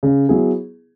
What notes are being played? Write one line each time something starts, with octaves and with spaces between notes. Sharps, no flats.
C#3
F#3 B3 E4 G#4